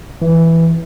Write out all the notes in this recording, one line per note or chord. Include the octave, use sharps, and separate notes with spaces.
E3